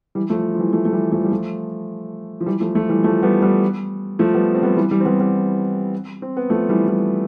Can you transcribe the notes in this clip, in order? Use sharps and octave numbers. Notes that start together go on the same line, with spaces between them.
E3 G3
F3 A3
F3
E3 G3
F3 A3
A3
E3 G3
F3 A3
G3
F3 A3
F3
E3 G3
F3 A3
F3 A3
E3 G3
F3 A3
G3 B3
G3 B3
F3 A3
G3 B3
C4
G3 B3
E3 G3
E3 G3
C4
G3 B3
G3 B3
C4
B3
F3 A3
E3 G3
E3 G3